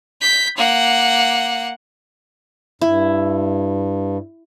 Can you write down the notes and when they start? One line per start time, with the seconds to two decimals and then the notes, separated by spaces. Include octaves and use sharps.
0.21 G6 B6
0.57 A#3 F#5
2.81 G2 E4